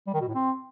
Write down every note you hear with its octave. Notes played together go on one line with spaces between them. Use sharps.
G3
D#3
B2
A2
C4